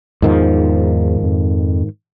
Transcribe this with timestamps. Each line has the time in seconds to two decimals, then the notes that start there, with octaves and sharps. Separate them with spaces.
0.22 E2 G#2 D#3 F3
1.23 F2